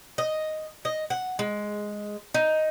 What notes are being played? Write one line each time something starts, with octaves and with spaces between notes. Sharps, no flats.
D#5
D#5
F#5
G#3
D#4